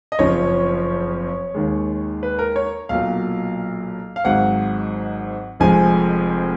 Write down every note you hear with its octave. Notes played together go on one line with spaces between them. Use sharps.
D#5
F#1 F2 C#3 F3 C#5
D#2 D#3 G#3
B4
A#4
C#5
B1 A#2 F#3 F5
F5
G#1 G#2 F#3 F#5
F1 F2 F3 G#3 G#5